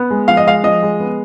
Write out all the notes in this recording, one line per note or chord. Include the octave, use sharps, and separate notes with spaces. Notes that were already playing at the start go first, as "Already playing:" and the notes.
Already playing: B3
G#3
F3 F5
D#5
G#3 F5
F3 D#5
G#3
B3